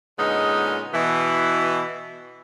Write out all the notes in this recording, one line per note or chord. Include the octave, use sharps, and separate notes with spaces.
A#2 D3 G#3 B3 C#4 D#4
B2 E3